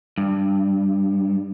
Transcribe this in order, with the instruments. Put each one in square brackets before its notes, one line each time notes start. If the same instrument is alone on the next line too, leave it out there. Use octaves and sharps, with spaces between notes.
[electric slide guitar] G2